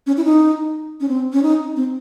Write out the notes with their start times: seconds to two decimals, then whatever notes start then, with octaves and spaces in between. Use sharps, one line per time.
0.07 C#4
0.17 E4
0.25 D#4
1.01 C#4
1.08 C4
1.33 C#4
1.43 D#4
1.76 C4